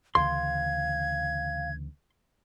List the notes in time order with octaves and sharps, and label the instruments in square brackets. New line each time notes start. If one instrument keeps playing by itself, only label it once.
[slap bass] D2 C#3 E3 [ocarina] F5 [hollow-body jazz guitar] C6 [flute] G#6